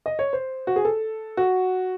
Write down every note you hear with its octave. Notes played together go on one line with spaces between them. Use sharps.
D#5
C#5
C5
F#4
G#4
A4
F#4